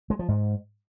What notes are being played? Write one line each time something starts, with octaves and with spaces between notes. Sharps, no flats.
G#3
F3
G#2